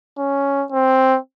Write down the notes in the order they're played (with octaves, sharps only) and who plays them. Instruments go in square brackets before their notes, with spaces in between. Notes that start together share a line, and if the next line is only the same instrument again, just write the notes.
[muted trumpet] C#4
C4